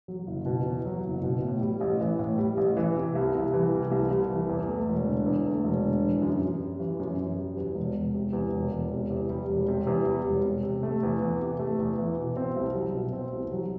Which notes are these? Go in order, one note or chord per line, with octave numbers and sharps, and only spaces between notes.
F#3
F#1
B2
E2
F#3
F#1
B2
A2
G3
A1
E3
A2
G3
A1
E3
C3
C2
C2
E3
C3
C2
C2
E3
E2
A3
E1
D3
E2
A3
E1
D3
E3
F#2
F#2
G3
E3
F#2
F#2
G3
E2
E1
E1
C3
E2
E1
E1
C3
E2
G3
E1
C3
E2
G3
E1
C3
C3
A3
E2
E3
C3
A3
E2
E3
B2
C4
C2
F#3
B2
C4
C2
F#3